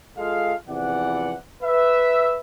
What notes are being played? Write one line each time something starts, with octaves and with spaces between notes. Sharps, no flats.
G#3 F4 A4 F5
E2 C3 E3 F3 D5 F#5
B4 E5